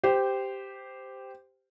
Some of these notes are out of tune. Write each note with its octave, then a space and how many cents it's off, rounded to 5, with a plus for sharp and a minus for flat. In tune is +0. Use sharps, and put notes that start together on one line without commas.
G4 +0 C5 -15